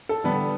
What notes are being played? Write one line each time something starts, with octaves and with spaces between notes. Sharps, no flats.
A4
D3 G3 B3 D4